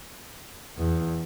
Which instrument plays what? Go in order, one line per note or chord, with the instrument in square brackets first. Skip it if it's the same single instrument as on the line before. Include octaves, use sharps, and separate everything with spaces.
[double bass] E2